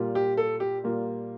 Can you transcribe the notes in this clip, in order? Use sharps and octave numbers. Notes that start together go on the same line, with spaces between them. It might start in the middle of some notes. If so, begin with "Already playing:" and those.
Already playing: A#2 G3 A#3 F4
G4
A4
G4
A#2 G3 A#3 F4